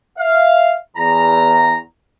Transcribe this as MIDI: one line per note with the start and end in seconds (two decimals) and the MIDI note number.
0.18 0.75 76
0.18 0.75 77
0.97 1.78 40
0.97 1.78 82